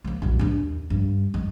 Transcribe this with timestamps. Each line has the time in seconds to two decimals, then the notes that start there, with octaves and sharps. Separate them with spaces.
0.04 D#2 A#3
0.22 B1 A2
0.39 D#2 D4
0.90 G2
1.34 D#3